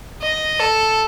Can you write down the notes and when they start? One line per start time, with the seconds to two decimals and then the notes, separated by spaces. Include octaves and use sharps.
0.22 D#5
0.60 A4